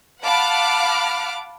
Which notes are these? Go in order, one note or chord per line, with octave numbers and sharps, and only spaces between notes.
F5 F#5 A5 B5 D6 F6